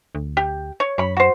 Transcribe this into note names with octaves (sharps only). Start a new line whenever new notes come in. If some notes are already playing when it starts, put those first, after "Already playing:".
D2
G4
C#5
F#2 C#5 B5
F#4 C5